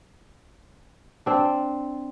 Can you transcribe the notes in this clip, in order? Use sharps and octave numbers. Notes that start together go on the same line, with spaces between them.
C4 D4